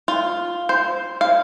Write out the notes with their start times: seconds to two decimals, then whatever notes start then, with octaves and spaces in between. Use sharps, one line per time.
0.08 F4
0.69 C5
1.21 F5